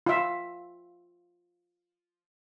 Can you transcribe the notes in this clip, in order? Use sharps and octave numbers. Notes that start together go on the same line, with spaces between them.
F4 E5